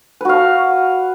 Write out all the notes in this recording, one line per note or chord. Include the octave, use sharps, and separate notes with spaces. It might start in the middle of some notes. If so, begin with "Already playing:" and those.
F#4 B4 F5 A5